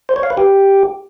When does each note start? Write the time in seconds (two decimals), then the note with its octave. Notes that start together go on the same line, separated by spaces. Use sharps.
0.09 C5
0.16 C#5
0.23 F5
0.30 B4
0.37 G4